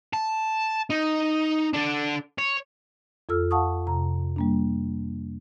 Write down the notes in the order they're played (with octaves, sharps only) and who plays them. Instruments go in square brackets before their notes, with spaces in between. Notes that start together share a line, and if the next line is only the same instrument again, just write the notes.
[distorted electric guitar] A5
D#4
D4 A4
C#5
[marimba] F2 F4 A4 E6 F6
F5 F#5 A5 C#6 D#6
F2 C3 A#5
G3 A#3 D4